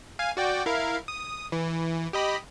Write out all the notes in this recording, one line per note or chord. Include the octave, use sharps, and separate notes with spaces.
F5 G#5
F#4 D5 G5
E4 A#4 F5
D#6
E3
G4 D#5 B5